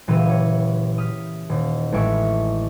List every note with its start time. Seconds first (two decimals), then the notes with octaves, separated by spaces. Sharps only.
0.07 F#1 A#2 E3 G4 E6 D#7
0.29 C#5
0.98 D#6 F6 B6
1.49 D#1
1.92 A1 G#3 E5 C#6 D7